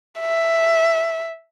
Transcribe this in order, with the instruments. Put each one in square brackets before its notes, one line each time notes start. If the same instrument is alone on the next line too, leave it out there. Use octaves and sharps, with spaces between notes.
[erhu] E5